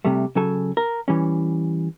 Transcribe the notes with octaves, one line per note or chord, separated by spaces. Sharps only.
C3 G3 A3
C#3 F#3 A4 G#5
A#4
E3 G3 C#4